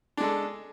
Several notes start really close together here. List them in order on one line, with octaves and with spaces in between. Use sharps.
D4 G#3 A4